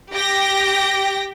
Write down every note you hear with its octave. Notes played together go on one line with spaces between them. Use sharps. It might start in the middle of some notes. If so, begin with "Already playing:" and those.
G4 G5 A#6